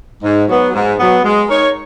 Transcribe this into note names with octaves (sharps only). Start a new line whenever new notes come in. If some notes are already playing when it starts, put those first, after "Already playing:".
G#2
F#3 B3
G#2
F#3 B3
G#3
D#4 A#4 C#5